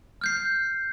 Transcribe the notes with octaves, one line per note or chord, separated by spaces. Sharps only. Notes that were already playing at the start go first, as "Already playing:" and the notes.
F6 G6 C7